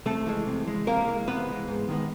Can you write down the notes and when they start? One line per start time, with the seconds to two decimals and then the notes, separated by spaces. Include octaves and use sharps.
0.06 C3 A3 A4
0.26 E3 G#3
0.47 C3
0.67 E3 G#3
0.87 C3 A#3 A#4
1.07 E3 G#3
1.27 C3 B3 B4
1.47 E3 G#3
1.68 G#2
1.88 D#3 G#3 B3